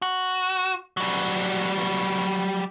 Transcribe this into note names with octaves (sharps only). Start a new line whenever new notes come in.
F#4
F#3 G3